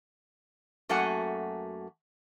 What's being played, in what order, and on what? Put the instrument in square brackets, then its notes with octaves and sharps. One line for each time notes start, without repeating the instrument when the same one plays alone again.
[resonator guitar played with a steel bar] F#2 A3 A#3 F#4 F#5 G#5